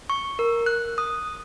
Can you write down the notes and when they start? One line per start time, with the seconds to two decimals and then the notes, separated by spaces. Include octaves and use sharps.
0.10 C#6
0.39 A#4
0.66 F#6
0.98 D#6